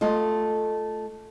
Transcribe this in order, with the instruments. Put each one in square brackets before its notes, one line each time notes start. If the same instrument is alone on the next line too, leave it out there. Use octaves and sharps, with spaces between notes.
[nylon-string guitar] A3 F4 D#5